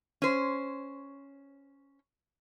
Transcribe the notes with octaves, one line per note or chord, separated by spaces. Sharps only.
C#4 C5